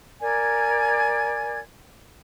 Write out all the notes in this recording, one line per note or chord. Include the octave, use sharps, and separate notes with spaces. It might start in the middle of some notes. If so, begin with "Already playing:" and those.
A#4 D5 G#5 G#6